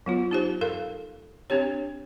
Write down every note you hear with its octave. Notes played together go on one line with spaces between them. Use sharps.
F#3 B3 F4
D#4 G4 C5
A4 A#4 F5
C4 D4 G4 C#5